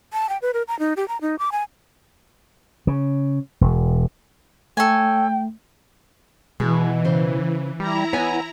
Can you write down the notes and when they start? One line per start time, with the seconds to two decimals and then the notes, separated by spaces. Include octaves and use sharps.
0.13 A5
0.29 G5
0.42 B4
0.54 A#4
0.68 A#5
0.79 D#4
0.97 G4
1.08 A#5
1.21 D#4
1.39 D6
1.52 G#5
2.87 C#3
3.61 E1
4.77 A3 A4 C#5 G5 G#5
6.60 B2 E3 G#3
7.05 C#3 C5
7.80 G3 E4 A#5
8.13 B3 C#5 G#5